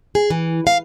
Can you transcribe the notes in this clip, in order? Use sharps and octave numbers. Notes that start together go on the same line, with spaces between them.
G#4
E3
F5